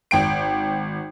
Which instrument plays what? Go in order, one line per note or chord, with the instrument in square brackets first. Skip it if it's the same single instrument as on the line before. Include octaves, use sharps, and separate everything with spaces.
[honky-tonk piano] G#1 G5 D7